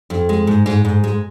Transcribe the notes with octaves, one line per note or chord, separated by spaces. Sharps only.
F2
G#3
G#2
G#2
G#2
G#3